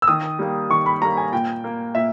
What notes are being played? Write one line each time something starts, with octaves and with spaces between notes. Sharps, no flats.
E6
D#3 D#6
G3 A#3
D#3 C#6
B5
G3 A#3 A#5
G#5
A#2 G5
A#3
A#2 E5